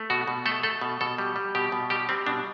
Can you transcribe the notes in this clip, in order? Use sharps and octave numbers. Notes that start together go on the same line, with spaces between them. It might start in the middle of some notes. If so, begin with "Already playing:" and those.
Already playing: A3
B2 F#4
B2
A3 A4
A3 A4
B2
B2 A4
G3
G3
B2 G4
B2
G3 G4
G3 C4
B2 D4